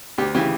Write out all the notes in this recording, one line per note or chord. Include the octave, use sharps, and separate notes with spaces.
D2 G4
C#3 E3 G4